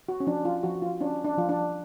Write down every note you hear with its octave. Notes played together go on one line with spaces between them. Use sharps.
F#4
C#4
F3 D4
F4
F3 F#4
F4
C#4 D4
D4
F3 F4
D4